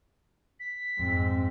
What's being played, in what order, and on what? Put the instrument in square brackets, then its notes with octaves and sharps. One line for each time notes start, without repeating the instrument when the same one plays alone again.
[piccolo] B6
[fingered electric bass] F2 [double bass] G#2 C4